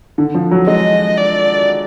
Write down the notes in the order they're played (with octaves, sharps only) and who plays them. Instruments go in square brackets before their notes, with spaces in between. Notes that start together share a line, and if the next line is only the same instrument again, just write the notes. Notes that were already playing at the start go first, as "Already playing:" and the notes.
[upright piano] D3
F3
F#3
[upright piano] G#3 [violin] D#5
[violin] D5